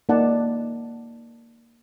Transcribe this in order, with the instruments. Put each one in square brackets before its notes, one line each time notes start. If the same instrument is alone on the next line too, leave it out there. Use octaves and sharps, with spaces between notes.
[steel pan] A#3 D#4 D5 F#5 A5